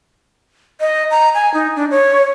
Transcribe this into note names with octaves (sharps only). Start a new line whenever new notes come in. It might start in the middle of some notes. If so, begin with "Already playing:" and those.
D#5
A#5
G#5
D#4
D4
C#5